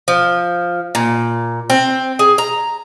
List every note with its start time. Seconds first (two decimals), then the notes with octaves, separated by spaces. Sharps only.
0.08 F3
0.95 A#2
1.70 C4
2.19 G#4
2.38 A#5